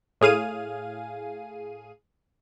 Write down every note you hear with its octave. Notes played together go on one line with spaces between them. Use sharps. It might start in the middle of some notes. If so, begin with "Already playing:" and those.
A2 G#4 F5 D#7